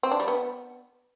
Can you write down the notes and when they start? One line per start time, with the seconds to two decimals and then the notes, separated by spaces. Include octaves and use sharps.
0.03 C4
0.12 D4
0.20 G3
0.28 B3